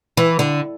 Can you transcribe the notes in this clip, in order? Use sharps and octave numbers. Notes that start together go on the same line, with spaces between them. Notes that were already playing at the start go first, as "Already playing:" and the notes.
E3
D3